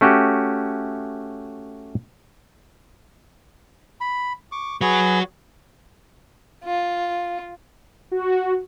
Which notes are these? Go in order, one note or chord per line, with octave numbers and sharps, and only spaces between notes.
A3 C#4 F#4 G4
B5
C#6 D6
F#3 F#4 G#4 B4
F4
F#4